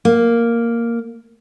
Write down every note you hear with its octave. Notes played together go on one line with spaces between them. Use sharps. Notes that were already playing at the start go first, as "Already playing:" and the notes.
A#3